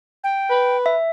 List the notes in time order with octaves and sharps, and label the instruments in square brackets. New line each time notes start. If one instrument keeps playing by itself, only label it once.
[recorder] G5
[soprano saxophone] B4
[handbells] E5